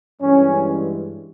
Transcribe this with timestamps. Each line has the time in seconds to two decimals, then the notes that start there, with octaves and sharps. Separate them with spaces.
0.21 G2 E3 G#3 C#4